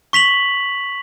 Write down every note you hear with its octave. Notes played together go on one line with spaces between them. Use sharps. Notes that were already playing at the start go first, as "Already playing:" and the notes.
C#6 B6 F7 F#7